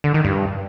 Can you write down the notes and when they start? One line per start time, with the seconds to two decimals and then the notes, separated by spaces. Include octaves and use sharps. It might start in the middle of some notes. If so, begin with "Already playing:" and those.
0.04 D3
0.14 D#3
0.25 G2